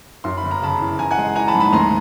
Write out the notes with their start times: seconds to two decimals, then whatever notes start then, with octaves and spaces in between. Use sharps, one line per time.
0.24 F#2 C6
0.37 B5
0.43 G1
0.51 A#5
0.62 C#3 A5 B5
0.80 E3
0.99 E3 G#5 A#5
1.11 F#5 G#5
1.18 G#3
1.36 E3 G#5 A#5
1.48 A5 B5
1.55 G#2
1.60 A5 B5
1.73 D2 A#5 C6